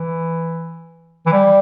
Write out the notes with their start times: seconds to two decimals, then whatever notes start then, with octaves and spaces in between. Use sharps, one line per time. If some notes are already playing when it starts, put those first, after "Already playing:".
Already playing: E3
1.26 E3
1.33 G3